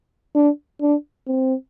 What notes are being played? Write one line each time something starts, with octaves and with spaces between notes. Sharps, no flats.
D4
D4
C4